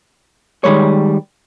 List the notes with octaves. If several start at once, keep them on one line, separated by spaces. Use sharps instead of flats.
D#3 G3 G#3 C#5